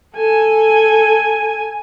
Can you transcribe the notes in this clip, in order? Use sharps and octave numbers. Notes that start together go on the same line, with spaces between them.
A4 G#5